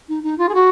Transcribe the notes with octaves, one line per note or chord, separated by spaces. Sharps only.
D#4
D#4
F4
G#4
F#4